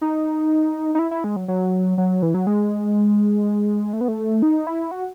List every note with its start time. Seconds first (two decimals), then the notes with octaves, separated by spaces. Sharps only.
0.01 D#4
0.95 D#4
0.99 E4
1.11 E4
1.24 G#3
1.36 F#3
1.48 F#3
1.98 F#3
2.22 E3
2.34 F#3
2.47 G#3
3.93 A3
4.01 B3
4.08 A3
4.42 D#4
4.67 E4
4.91 F#4